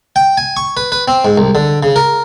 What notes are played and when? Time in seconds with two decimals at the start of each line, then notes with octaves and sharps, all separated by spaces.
0.16 G5
0.37 G#5
0.57 C#6
0.77 B4
0.92 B4
1.08 C4
1.25 G#2
1.38 C2
1.55 D3
1.83 C#3
1.96 A#4